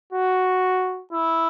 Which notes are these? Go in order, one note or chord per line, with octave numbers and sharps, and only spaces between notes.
F#4
E4